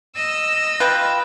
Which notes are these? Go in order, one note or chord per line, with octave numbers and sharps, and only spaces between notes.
D#5 E6
F4 B4 G5